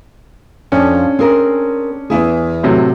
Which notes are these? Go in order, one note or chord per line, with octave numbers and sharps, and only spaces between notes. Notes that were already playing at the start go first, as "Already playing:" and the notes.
F2 C#4 D4
C4 G#4 A#4
E2 E4 G#4
A2 C3 F#3